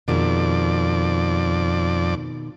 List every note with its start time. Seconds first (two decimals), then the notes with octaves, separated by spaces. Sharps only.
0.08 F2 B2 D#3 G#3 D5